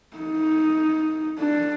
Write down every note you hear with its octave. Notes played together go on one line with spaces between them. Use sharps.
D#4
D4